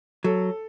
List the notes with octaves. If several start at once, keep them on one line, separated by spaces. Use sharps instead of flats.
F#3 A4